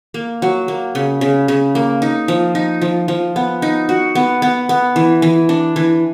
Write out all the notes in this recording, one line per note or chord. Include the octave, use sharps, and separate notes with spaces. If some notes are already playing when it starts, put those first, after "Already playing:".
A#3
F#3
A#3
C#3
C#3
C#3
A#3
D#4
F3
D#4
F3
F3
B3
D#4
F#4
B3
B3
B3
E3
E3
D4
E3